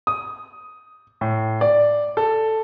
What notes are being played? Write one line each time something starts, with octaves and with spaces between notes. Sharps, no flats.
D#6
A2
D5
A4